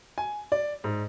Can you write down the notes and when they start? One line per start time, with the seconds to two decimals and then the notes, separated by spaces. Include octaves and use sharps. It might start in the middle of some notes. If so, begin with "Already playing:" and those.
0.18 G#5
0.52 D5
0.84 G#2